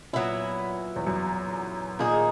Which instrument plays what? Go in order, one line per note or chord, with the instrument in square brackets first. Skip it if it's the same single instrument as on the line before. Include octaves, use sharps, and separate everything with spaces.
[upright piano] A#2 [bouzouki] F#3 B3 E4
[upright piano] E2
F#2
[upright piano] A#2 [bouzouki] D#3 A#3 D#4 G#4